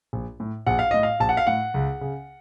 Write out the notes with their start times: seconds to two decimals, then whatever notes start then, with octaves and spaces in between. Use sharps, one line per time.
0.13 A#1
0.40 A2
0.67 A#1 F#5
0.79 F5
0.91 A2 D#5
1.03 F5
1.20 A#1 A5
1.29 F#5
1.37 F5
1.47 A2 F#5
1.74 C#2
2.01 C#3